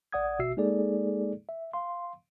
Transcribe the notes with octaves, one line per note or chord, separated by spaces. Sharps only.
A#1 D5 F#5 D#6 G#6
G#1 B2 F#4 E5 E6 C7
G#3 A#3 D#4 G#4 A4 D5
E5
F5 C6